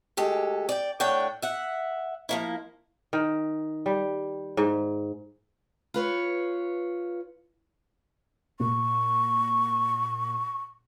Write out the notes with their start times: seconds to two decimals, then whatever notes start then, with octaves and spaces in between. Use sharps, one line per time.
0.17 D2 G#3 G4 A4
0.69 D5 D#5 G5
1.00 A2 D4 C#5 F#5 G5
1.42 E5 F#5
2.29 F3 A#3 E4
3.13 D#3
3.86 G3
4.57 G#2
5.94 F4 B4 C#5
8.60 A#2 C#6